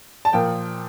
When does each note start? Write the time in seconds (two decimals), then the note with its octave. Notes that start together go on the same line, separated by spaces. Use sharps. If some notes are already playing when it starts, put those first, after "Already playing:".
0.25 A5
0.33 A#2 F3 A#3 G5